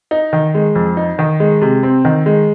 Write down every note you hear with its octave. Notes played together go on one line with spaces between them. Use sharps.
D#4
D#3
G#3
F2
D#4
D#3
G#3
C3
C4
D#3
G#3